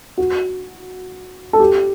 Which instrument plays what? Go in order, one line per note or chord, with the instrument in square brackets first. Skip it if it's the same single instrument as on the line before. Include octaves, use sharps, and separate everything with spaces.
[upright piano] F#4
A4
G4